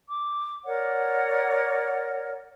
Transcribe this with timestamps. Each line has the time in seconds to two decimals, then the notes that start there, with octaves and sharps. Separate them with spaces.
0.08 D6
0.65 A#4 C#5 D5 F#5